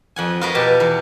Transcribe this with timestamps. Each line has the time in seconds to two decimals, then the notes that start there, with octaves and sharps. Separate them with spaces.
0.16 F2 F#5 G#5
0.41 F4 F#4 A#4 B4 D#5
0.55 B2 G4 A5
0.80 E2